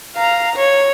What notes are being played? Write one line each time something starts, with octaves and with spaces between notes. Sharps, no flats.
F5 A#5
C#5